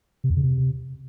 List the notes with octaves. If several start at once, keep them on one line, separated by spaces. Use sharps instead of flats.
C3
E2
C#3
C3